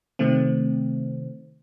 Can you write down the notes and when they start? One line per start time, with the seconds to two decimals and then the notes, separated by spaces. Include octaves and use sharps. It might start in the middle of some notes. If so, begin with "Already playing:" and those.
0.19 C3 D#3 A3 C4